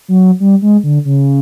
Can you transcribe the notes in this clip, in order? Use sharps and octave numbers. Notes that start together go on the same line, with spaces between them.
F#3
G3
G#3
D3
C#3